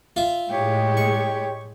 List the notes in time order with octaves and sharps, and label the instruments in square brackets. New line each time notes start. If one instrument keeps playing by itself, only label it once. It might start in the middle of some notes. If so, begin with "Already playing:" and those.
[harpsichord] F4 E5
[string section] A2 G#3 [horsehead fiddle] G4 C#5
[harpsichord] C#6